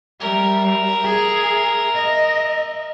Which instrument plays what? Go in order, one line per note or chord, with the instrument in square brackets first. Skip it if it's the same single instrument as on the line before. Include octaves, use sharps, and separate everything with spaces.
[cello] G3 [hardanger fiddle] A#4 E5
[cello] G#4
D#5